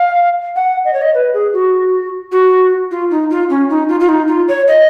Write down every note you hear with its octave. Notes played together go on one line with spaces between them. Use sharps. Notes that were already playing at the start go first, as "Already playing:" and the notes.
Already playing: F5
F#5
D#5
C#5
D#5
B4
G#4
F#4
F#4
F4
D#4
F4
C#4
D#4
F4
F4
D#4
F4
C#5
D#5